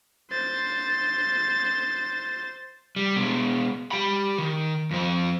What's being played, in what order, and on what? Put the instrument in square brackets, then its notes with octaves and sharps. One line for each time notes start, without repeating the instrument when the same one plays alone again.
[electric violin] C5 A6
[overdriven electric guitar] G3
B2 G#3
G4 B5
D#3
F2 C4